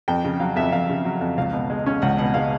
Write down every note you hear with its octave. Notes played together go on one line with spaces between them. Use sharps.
F2 G5
C#3
F#3 F5
F2 E5
F2 F5
C#3
F#3
F2
C#2 F5
B2
G#3
C#4
C#2 F#5
B2 F#5
G#3 F5